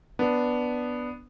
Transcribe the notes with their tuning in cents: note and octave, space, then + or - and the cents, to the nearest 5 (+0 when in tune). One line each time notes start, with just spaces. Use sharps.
B3 +0 D4 +0